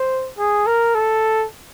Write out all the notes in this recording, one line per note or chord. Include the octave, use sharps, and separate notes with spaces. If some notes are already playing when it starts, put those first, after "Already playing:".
Already playing: C5
G#4
A#4
A4